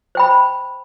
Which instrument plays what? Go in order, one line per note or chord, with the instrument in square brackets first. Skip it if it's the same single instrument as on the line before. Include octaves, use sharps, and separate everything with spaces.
[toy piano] C5 G5 B5